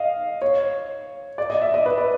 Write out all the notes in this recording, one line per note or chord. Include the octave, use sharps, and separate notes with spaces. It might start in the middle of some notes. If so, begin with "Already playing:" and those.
Already playing: D#5 F5
C#5
D5
D#5
E5
D#5
B4
D5